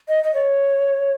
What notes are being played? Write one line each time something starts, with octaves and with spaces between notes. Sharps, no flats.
D#5
D#5
C#5